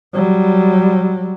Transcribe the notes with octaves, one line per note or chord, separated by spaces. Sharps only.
F#3 G3